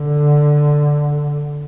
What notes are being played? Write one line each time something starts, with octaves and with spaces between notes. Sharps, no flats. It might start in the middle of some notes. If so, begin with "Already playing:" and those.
Already playing: D3